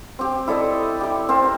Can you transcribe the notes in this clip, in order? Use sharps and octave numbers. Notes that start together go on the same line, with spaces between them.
C4 G4
E4 A4 D5 D#5
E4 G4
C4 A#4 C5 A5